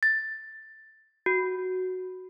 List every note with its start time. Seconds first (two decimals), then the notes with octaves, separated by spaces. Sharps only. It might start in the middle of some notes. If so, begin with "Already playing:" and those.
0.03 A6
1.26 F#4